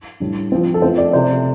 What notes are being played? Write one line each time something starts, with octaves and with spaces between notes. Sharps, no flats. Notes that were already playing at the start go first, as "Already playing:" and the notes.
A2 G3 D4
F3 C4
A4
F3 A3 C4 C5
D5
C3 A3 C4 C5